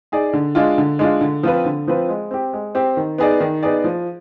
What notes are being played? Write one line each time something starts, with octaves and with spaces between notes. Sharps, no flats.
D#4 G#4 D5
D3
G#3 D4 F4
D3
G#3 D4 F4
D3
F3 C4 F4 B4
D3
F3 C4 F4 B4
G#3
C4 G4
G#3
C4 G4
D#3
B3 D#4 G#4 D5
D#3
B3 D#4 G#4 D5
F3